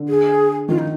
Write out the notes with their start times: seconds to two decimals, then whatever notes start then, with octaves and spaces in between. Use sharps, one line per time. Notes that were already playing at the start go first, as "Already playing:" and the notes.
Already playing: D3
0.09 G#4
0.68 D#3 F4
0.79 D#4